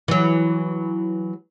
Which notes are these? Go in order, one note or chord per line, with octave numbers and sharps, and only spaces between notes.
E3 F#3